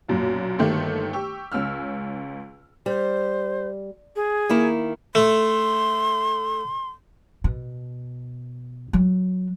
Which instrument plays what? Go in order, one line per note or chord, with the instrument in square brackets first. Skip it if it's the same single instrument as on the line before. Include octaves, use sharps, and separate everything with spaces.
[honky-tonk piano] B1 F#2 A#2
G1 D#3 A3 A#3 G4 C6
G4 C#6 E6
C#2 C#4 E6 F6
[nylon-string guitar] G3 [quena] C5
[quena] G#4
[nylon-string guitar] D#3 A#3 E4
[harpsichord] A3 [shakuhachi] C6
[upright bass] B2
F#3